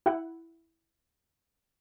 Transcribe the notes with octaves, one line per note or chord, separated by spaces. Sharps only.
E4 F#5